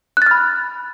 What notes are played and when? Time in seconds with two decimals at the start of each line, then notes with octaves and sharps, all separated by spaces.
0.17 F#6
0.22 A6
0.26 F6
0.31 B5